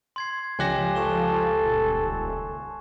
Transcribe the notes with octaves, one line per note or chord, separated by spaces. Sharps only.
C6 G#6 C7
C#2 F3 G4 G#5 F#6 A#6 E7
A4 C#6 E7 G7
D#1